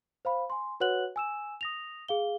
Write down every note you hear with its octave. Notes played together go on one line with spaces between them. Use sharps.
C5 F5 B5
G#5 C6
F#4 B4 C#5 F#5 F#6 F#7
G#5 E6 E7
D#6 A#6 F7
G#4 F5 G7